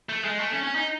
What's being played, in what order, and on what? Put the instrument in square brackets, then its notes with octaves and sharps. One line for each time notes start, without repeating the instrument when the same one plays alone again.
[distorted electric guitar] A3
G#3
A3
C#4
C#4
D#4